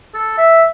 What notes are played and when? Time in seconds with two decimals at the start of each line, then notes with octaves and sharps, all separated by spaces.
0.15 A4
0.38 E5